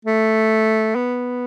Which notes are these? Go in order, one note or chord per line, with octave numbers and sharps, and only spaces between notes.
A3
B3